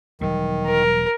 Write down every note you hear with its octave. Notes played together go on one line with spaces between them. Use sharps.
E1 D#3 F#3 G3
A#4